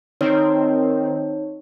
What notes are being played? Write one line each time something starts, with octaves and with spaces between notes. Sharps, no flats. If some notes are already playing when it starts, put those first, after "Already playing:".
D#3 C4 D#4 C#5